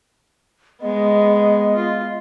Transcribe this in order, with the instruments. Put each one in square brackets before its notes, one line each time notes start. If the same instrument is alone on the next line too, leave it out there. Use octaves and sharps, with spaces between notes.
[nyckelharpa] G#3 B3 [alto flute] D#5
[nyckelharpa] F4